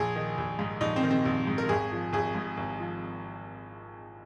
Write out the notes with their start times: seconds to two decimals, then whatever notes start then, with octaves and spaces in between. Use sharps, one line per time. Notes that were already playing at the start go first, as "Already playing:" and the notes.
Already playing: A#1 G#4
0.16 D#3
0.38 A#1
0.59 G#2
0.81 A#1 D#4
0.96 C4
1.03 D#3
1.11 C4
1.25 A#1
1.47 G#2
1.58 A#4
1.69 G#1 G#4
1.92 F3
2.13 G#1 G#4
2.35 G#2
2.57 G#1
2.80 F3